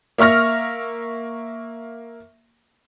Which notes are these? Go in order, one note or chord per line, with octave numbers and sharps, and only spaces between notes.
A#3 E5 C#6 F6 A#6